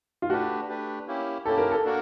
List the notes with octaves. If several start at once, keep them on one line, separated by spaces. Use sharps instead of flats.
F4
A3 D4 F#4 G4 B4
A3 D4 G4 B4
A#3 C#4 E4 G4
A#3 C#4 E4 G4 A4
A#4
A4
A#3 D4 F#4 A#4